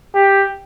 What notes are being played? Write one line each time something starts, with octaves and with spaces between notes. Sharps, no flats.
G4